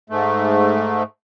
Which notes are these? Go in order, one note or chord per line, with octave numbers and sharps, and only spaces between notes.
G#2 A3